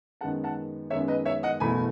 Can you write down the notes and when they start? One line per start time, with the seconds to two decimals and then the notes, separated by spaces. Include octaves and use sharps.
0.21 F#2 D#3 G#3 B3 F#5 A5
0.44 F#5 A5
0.90 F#2 D#3 G#3 B3 C#5 E5
1.08 B4 D#5
1.25 C#5 E5
1.43 D#5 F#5
1.60 F#1 E2 B2 A3 G#5 B5